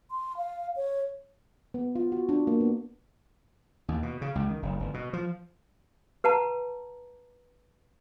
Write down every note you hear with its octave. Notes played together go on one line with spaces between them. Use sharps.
C6
F5
C#5
B3
F4
F#4
D4
A#3
B3
D#2
B2
C#3
C#2
D#3
F#1
G1
B2
F3
B4 F#5 A5 A#5